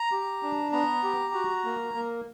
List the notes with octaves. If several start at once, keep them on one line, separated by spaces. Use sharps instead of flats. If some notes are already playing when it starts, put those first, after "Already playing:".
Already playing: A#5
G4
D4
B3 A#5
G4
F#4
A#3
A#3